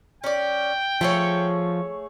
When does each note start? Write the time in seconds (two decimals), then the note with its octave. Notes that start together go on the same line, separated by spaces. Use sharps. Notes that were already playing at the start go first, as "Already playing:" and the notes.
0.24 C#4 D5 G5
1.01 F3 A3 G#4 C#5